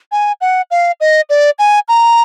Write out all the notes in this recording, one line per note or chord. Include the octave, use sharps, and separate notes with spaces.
G#5
F#5
F5
D#5
D5
G#5
A#5